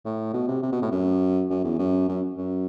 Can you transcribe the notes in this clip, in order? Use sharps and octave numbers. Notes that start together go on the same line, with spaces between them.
A2
B2
C3
C3
B2
A2
F#2
F#2
E2
F#2
F#2
F#2